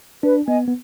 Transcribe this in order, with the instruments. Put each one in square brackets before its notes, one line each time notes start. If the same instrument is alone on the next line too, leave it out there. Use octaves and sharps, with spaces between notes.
[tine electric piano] D4 [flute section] B4
[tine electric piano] B3 [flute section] D#5 G#5
[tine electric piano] B3